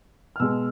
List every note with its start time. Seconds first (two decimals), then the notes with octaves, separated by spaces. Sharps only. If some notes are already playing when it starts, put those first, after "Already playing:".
0.36 F6
0.40 B2 G#3 E6